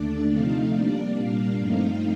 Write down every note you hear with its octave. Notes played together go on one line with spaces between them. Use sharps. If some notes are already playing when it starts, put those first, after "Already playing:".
Already playing: D#2 D3 A3 D4 D5
C3 F3 A3 C4 D#4 F5
C3 G3 A#3 D4 D5
A#2 G3 A#3 D4 F5
G2 F3 A3 C4 D#4 F5